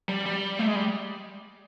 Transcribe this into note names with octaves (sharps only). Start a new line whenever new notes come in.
G3
G3
A3
G#3
G3